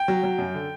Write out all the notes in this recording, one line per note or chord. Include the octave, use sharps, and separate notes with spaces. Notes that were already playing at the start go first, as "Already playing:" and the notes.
Already playing: G5
F#3
F#3
F#2
D3